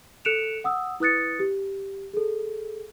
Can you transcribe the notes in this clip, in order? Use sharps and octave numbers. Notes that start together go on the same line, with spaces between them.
A4 F#6 C#7 D7 E7 F7
F#5 D#6 E6
E4 B4 D#6 F#6 A6 C#7
G4
G#4 A4